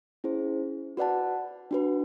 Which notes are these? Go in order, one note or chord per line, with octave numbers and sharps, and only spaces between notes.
C#4 E4 G#4 C5
F#4 B4 D5 F#5 A5
D4 F#4 B4